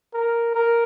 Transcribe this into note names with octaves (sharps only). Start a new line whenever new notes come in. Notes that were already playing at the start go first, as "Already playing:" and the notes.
A#4
A#4